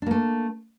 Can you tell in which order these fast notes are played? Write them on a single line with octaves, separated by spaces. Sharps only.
D4 A#3 A3